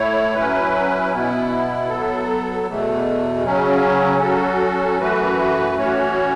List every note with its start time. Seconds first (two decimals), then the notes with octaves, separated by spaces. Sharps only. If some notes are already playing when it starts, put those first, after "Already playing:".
Already playing: A2 A3 E4 C#5
0.35 F#3 C#4 E4 B4
1.12 B2 B3 E4
1.89 F#3 B3 A4
2.67 E2 B2 A3
3.44 C#3 F#3 C#4
4.21 F#3 C#4 F#4 A4
4.98 F#2 E3 A3 F#4 B4
5.75 A2 E3 C#4 F#4 C#5